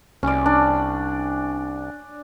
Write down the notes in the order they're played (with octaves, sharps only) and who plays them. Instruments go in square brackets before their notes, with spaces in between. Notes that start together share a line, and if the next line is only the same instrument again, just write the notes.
[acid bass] C2 [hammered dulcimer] C#4 D5
[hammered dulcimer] D4